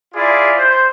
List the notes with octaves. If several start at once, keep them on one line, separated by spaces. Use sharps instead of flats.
E4 F4 G#4 D5
C5